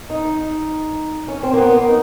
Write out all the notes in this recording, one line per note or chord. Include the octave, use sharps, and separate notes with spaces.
D#4
C#4
C4
A#3
B3
A#3
D#4